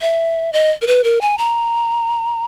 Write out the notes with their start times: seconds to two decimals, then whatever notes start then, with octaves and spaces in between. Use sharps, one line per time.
0.01 E5
0.53 D#5
0.82 A#4
0.87 B4
1.04 A#4
1.21 G#5
1.38 A#5